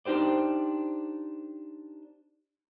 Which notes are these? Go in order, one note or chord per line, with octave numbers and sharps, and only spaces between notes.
D4 D#4 G4 C5 D5